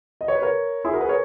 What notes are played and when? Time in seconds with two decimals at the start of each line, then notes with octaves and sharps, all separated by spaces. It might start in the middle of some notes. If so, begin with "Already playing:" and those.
0.21 D#5
0.28 C#5
0.35 B4
0.42 A#4 C#5
0.85 E4 G#4
0.93 F#4 A#4
1.01 G#4 B4
1.09 A#4 C#5